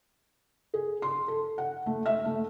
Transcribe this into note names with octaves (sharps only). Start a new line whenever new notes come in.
G#4
C6
A4
F#5
A3
E5
A3